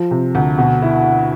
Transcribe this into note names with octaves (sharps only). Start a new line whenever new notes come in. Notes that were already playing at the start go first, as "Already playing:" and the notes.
Already playing: F3
C3
D2
B2
E4